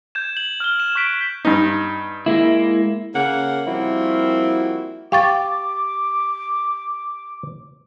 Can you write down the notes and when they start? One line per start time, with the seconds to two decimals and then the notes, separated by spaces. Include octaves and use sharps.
0.15 G6 G#6 E7
0.37 F#7
0.60 F6 F#7 G7
0.80 E7
0.95 C#6 F#6 B6 D7 G7
1.45 G2 D#4
2.26 G#3 A#3 E4
3.15 C#3 A#3 F#5
3.67 F3 G3 A#3 C4 E4 F#4
5.12 G4 F5 C#6 D6 A6